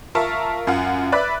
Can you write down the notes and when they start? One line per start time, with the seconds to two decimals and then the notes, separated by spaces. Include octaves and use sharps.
0.15 F4 A#4 E5 A5 C#6
0.67 F#2 F4 F#5
1.12 B4 D5 E5 B5 D6 F#6